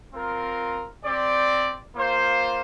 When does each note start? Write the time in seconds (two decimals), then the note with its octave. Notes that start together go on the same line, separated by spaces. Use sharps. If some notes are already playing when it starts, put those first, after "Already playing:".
0.14 C4 F4 A#4
1.05 C4 G4 D5
1.95 A#3 F4 C5